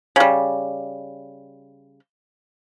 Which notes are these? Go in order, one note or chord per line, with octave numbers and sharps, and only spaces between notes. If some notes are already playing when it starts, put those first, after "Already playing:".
C#3 G3